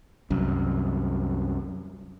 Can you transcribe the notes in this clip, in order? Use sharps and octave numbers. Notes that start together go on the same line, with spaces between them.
C2 F#2